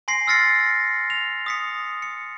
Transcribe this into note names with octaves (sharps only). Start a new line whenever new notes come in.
G#5 C6 A#6 C7
E6 F6 A6 A#6 C#7
F7
D#6 B6 C#7
C#7